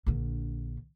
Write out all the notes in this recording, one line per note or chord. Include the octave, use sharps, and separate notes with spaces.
A#1 D3